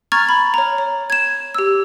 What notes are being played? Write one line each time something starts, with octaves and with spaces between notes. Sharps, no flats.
A#5 C#6 F6 G#6 A6
B5
C#5 A#5
C#5
G#6 E7
G4 E6